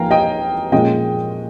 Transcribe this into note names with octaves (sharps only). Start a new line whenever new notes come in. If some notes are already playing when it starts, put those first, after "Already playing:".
Already playing: F3 A#3 F5 G5 G#5 A#5
D#5 G5
A#2 F3 G#3 C#4 F4 D#5 G5